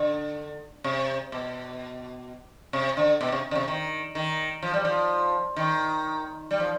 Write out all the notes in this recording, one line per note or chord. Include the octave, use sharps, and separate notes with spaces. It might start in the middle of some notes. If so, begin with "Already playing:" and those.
Already playing: D3
C3
B2
C3
D3
B2
C3
D3
C3
D#3
D#3
F3
G3
F3
D#3
G3
F3